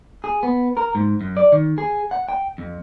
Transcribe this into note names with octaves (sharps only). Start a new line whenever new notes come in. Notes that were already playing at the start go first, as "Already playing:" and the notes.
G#4
B3
A#4
G#2
F#2
D5
D#3
G#4
F#5
G5
F2